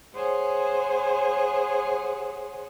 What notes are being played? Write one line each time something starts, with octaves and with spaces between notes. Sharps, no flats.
G#4 C5 C#5 F#5 G#5